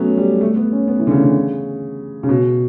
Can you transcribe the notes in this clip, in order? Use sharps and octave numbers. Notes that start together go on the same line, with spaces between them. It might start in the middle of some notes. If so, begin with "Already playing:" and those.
Already playing: F#3 A3 B3 C#4
G3
A3
B3
C#4
B3
E3
D3
C#3
C#3
C#3
B2